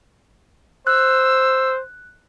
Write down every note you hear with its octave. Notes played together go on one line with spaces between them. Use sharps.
C5 E6 F#6